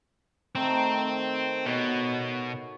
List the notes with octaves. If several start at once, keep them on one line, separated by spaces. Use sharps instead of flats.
D#3 A3 C4 D#4
B2 F#4 C#5